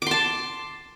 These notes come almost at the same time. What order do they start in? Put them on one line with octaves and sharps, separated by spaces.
D6 C6 A5